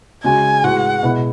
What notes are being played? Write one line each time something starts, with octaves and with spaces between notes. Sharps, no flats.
C#3 G#3 C#4 F#4 G#5
A2 G#3 B3 F#4 F#5
B2 G#3 B3 E4